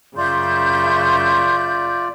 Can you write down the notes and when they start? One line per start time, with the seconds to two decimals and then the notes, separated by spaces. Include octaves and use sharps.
0.17 F#2 C#3 F4 D5 E5 C6 G6